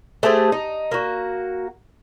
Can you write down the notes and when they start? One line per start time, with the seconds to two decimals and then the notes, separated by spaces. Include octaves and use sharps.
0.23 A3 G4 G#4 C5
0.52 D#4
0.91 A#3 F#4